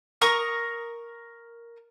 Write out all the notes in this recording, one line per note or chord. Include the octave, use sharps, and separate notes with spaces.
A#4 A#5 C#6 D#6